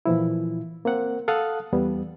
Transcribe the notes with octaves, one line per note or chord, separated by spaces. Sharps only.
A#2 E3 F3 E4
A#3 C4 F#5
A4 F5 F#5 A5 D#6 F#6
E2 G3 B3